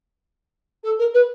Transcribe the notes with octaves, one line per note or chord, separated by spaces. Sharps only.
A4
A#4
B4